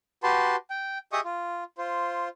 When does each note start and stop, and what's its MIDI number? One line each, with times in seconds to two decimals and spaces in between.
0.23 0.56 66
0.23 0.56 67
0.23 0.56 71
0.23 0.56 81
0.23 0.56 84
0.70 0.98 79
1.12 1.20 67
1.12 1.20 68
1.12 1.20 75
1.12 1.20 76
1.12 1.20 85
1.12 1.20 87
1.24 1.64 65
1.78 2.29 65
1.78 2.29 72